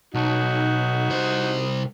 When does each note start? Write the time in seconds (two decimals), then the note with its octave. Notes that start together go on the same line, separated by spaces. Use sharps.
0.14 B1 D#4 F#4
1.10 C2 C5